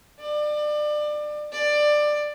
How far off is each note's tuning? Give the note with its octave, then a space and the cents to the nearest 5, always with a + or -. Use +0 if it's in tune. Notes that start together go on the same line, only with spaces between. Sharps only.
D5 +30
D5 +15